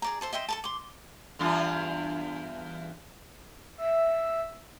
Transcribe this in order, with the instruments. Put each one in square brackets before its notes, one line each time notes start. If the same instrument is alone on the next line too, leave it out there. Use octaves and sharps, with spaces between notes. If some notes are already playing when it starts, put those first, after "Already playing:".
[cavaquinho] G#4 D5 A#5
A4 C5 E5
D#5 E5 G5 C6
A4 A#4 A5
C6 D6
[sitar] E2 G2 F4
[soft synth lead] E5